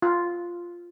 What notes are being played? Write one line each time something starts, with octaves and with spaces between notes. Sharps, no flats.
F4